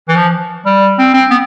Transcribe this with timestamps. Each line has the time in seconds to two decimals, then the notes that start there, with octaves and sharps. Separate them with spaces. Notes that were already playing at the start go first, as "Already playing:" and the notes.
0.08 E3
0.16 F3
0.66 G3
0.98 C4
1.14 C4
1.30 B3